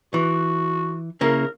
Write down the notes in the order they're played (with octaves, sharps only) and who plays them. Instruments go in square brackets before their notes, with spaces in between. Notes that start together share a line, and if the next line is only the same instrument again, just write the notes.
[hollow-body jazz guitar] E3 [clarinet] F#4
[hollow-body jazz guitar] C#3 A#3 E4 [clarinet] A#4